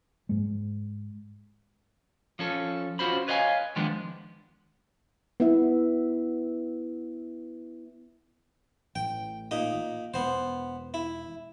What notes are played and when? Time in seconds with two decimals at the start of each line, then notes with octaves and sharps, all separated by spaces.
0.29 G#2 G#3
2.39 F3 C#4 A4
2.99 C#4 F4 F#4 C5 B5
3.28 B4 C#5 D#5 F5 G5 G#5
3.76 D#3 F3 G#3 B3 D4
5.40 B3 E4 E5
8.96 A1 G5
9.51 A#2 D#4 D#6
10.14 E1 B3 C5
10.94 E4